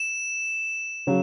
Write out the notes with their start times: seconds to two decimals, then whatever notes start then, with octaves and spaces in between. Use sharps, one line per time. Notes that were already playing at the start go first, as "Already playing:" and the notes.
Already playing: E7
1.07 C#3 F#3